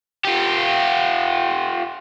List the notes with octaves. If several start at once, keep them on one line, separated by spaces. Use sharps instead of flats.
F4 G4